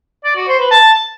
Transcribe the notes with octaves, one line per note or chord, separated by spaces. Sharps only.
D5
F#4
C5
B4
A5